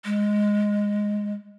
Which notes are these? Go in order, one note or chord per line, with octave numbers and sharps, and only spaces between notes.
G#3